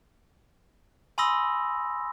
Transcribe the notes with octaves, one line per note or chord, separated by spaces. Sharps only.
G#5 B5 C6 D#6 E6 A#6